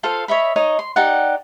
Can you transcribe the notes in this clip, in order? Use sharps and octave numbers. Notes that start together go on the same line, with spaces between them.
F4 A4 C5 F5
C#5 D#5 E5 B5
D#4 C#5 D#5
C6
D#4 G4 D5 F#5